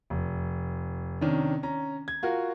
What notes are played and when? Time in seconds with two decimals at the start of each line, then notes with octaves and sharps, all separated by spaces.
0.10 F1
1.21 C3 D#3 C#4 D4
1.63 C#4 A#5
2.08 G#6
2.23 F4 F#4 A#4